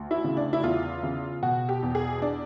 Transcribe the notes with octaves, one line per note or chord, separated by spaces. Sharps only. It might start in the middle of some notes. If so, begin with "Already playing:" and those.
Already playing: D2
E4
C#3
D4
E4
E2 F4
C#3
B2 F#4
G4
E2
G#4
D4